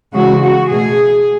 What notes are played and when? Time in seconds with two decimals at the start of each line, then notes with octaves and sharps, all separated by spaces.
0.13 C#3 E3 G#3 F#4
0.42 F#4
0.70 B2 A3 G#4